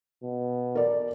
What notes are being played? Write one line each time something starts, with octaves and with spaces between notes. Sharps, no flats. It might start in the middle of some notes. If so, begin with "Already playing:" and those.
B2
A#4 D5